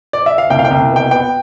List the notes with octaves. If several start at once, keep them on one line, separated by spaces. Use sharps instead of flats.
D5
E5
F5
C2 G5
F5
G5
C2
B2 G5
B3 G5